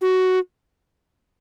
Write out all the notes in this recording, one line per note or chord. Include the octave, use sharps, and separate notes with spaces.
F#4